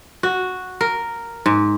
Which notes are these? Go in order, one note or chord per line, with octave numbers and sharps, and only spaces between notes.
F#4
A#4
G#2